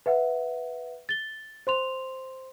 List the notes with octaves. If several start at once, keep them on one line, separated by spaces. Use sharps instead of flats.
B4 E5 F#5
A6 G7
C5 C6 F7